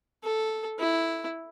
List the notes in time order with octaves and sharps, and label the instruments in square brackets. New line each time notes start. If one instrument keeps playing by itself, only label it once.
[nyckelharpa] A4
E4